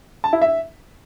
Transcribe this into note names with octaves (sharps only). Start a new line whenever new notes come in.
A5
E4
E5